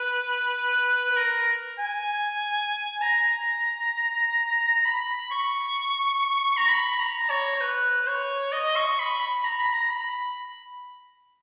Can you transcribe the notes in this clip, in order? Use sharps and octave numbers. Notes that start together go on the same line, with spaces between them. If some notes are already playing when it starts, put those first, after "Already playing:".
Already playing: B4
B4
A#4
G#5
A#5
B5
C#6
A#5
B5
A#5
C#5
C#5
B4
B4
C#5
D#5
C#6
B5
B5
A#5
B5
A#5
B5